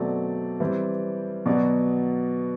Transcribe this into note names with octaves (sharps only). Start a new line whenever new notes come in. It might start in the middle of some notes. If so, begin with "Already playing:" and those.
Already playing: B2 F#3 A3 C4 D5
E3 G3 C4
B2 F#3 B3 D5